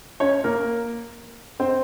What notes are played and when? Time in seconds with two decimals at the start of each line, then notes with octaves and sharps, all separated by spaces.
0.20 C#4 C#5
0.44 A#3 A#4
1.60 C4 C5